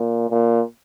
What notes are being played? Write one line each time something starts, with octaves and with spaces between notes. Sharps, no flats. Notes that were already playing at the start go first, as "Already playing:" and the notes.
Already playing: A#2
A#2